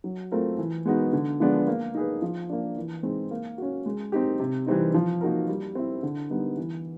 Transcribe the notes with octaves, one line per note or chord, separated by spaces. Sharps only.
F#3
A3 C4 F4 A#4
E3
G#3 B3 D#4 F#4
D3
F3 G#3 B3 D4
A#3
D#4 G#4 B4
F3
A#3 D4
E3
G#3 C4 D#4
A#3
C#4 F#4
G#3
C4 D#4 G4
C3
E3 G3 C4 D#4
F3
A#3 D#4 F#4 A#4
G3
C4 E4
D3
G3 B3 D#4
E3